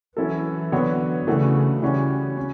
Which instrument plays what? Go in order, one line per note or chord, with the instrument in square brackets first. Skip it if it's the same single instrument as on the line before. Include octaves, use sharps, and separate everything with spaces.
[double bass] E3 [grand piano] F#3 C#4 E4 A4
[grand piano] D3 F#3 B3 F#4 C#5
[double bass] C#3 [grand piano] E3 A3 D4 F#4
[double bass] C#3 [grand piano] E3 G3 C#4 F#4 C#5
[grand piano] C#4